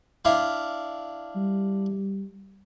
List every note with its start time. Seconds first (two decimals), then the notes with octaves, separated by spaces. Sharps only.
0.25 D4 E4 F5
1.36 G3